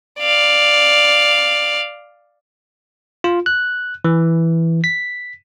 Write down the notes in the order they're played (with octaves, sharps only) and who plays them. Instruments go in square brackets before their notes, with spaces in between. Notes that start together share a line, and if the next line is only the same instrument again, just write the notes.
[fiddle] D5 F5
[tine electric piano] F4
F#6
E3
B6